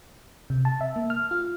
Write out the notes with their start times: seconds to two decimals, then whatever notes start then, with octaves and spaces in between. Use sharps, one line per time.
0.50 C3
0.65 A5
0.81 E5
0.96 A#3
1.10 F6
1.31 F4